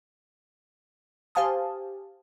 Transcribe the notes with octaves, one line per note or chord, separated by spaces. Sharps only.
G4 C5 F5 G#5 A5 D#6